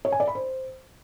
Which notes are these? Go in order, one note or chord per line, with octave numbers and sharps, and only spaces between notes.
C#5
G#5
D5
B5
C5